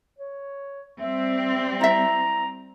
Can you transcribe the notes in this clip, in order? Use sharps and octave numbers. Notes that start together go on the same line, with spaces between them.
C#5
G3 C4 E5
E4 E5 A#5